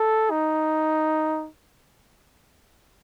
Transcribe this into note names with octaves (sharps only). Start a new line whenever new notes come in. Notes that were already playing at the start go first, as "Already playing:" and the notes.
Already playing: A4
D#4